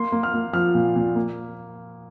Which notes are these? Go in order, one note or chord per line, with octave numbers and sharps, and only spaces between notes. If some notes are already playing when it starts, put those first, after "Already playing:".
Already playing: A#3 C6
A#3
F6
A#3
F3 F6
A#2
A#2
A#3